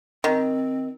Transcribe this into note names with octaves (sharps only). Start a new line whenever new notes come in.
D#3 C4